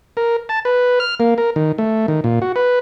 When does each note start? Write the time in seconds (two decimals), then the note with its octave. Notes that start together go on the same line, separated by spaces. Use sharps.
0.17 A#4
0.49 A5
0.65 B4
1.00 F6
1.20 A#3
1.38 A#4
1.56 D#3
1.78 A3
2.08 D#3
2.24 A#2
2.42 F#4
2.56 B4